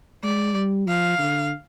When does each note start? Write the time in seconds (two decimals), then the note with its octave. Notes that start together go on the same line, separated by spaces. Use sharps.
0.24 G#3 D5
0.55 G3
0.87 F3 F5
1.19 D3